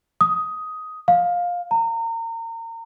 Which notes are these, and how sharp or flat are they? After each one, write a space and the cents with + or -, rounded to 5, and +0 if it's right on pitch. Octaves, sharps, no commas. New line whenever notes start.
D#6 +10
F5 +15
A#5 -30